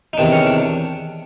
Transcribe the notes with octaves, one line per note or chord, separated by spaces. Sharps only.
D#4
E2 C3 D#3 D4
C#4
D4